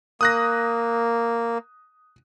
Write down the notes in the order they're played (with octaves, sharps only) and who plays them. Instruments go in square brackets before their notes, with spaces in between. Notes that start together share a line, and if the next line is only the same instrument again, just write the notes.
[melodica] A#3 [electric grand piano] D#6 F#6 A#6